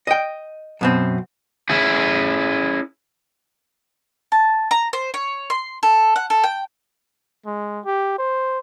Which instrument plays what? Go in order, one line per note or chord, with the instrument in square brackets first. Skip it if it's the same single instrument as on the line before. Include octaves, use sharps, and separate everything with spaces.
[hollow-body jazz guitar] D#5 G5
F#2 B2 C4
[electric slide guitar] C#4 E4 G#4
[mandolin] A5
A#5
C5
C#5
C6
A4
F#5
A4
G5
[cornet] G#3
G4
C5